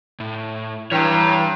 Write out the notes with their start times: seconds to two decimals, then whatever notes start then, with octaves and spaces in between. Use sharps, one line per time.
0.20 A2
0.92 G2 E3 C#5 A#5